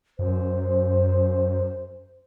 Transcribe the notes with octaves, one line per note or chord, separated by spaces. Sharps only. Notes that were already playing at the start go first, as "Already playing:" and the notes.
F#2 C5